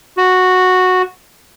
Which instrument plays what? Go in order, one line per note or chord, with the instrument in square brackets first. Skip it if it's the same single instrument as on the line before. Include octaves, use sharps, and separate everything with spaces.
[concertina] F#4